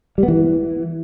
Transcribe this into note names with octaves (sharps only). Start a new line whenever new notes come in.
G3
B3
E3